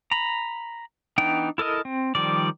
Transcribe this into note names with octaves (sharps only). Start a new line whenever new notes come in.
A#5 B5
E3 B3 D4 D#4 G5
E4 A4 A#4 D#5
C4
D#3 F3 G3 D5